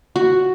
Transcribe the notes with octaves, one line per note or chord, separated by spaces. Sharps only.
F#4